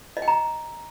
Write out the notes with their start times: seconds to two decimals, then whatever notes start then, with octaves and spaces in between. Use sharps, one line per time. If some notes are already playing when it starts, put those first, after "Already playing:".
0.17 D#5
0.22 G5
0.28 A#5